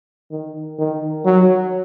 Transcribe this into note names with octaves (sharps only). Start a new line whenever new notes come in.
D#3
D#3
F#3